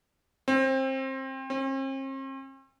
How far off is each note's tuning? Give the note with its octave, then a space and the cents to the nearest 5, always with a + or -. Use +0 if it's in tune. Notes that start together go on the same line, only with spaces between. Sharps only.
C4 +25
C4 +45